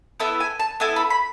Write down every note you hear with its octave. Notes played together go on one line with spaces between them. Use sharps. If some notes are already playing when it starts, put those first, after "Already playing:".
B3 E4 A4 E5
G#5
A5
B3 E4 A4 G#5
B5
B5